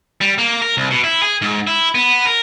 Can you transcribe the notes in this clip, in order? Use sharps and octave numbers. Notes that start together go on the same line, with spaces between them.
G3
A#3
A#4
C2
B2
E4
G#4
G#2
E4
B3
A#4